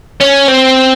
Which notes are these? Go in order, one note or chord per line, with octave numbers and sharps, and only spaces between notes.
C#4
C4